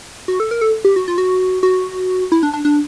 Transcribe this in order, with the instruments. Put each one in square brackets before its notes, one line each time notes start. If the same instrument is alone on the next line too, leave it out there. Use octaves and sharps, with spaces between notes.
[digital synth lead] F#4
A4
A#4
A4
G4
F#4
F4
F#4
F#4
E4
D4
D4
D4